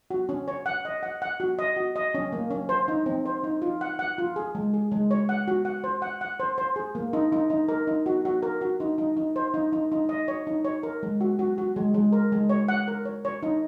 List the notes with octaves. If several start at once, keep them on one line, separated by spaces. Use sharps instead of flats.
F#4
C#4
C#5
F#5
D#5
F#5
F#5
F#4
D#5
F#4
D#5
C#4
A#3
C#4
C5
D#4
C4
C5
D#4
F4
F#5
F#5
F4
G#4
G#3
G#4
G#3
C#5
F#5
F#4
F#5
C5
F#5
F#5
C5
C5
G#4
A#3
D#4
D#4
D#4
A#4
D#4
F#4
F#4
A#4
F#4
D#4
D#4
D#4
C5
D#4
D#4
D#4
D#5
C#5
D#4
C#5
A#4
G#3
F#4
F#4
F#4
G#3
G#3
A#4
G#3
C#5
F#5
A#4
C#5
C#5
D#4